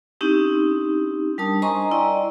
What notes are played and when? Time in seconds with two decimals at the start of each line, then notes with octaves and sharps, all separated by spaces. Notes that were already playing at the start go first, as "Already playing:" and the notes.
0.21 C4 C#4 D#4 E4 G4
1.38 G3 D4 A#4 A5 D#6
1.62 C5 D#5 G#5 A#5 C6 C#6
1.92 E4 D5 D#5 G5